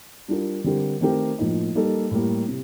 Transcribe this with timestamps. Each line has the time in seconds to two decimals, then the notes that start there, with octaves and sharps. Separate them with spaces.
0.28 G3 D4 F4 A#4
0.64 D3 G3 C4 G4 A#4
1.01 D#3 A3 C4 G4 A#4
1.39 A2 F3 A#3 D#4
1.75 G3 A#3 D#4 A4
2.11 A2 G3 A#3
2.48 C3